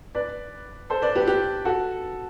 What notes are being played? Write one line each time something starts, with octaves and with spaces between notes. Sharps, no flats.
B4 D5
A4 C5
B4 D5
G4 B4
G4 B4
F#4 A4